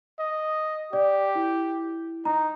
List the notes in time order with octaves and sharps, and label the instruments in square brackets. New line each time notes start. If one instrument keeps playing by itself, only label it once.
[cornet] D#5
[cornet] G4 [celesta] D5
[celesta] E4
[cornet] D#4 [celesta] A#5